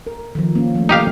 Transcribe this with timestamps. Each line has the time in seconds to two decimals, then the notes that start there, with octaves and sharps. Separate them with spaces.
0.07 A#4
0.35 D#3 F3
0.55 A#3 C#4
0.75 F3 A3
0.89 D#4 G4 F5